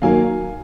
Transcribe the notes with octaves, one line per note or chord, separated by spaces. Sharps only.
D#3 F#3 A#3 F5 G#5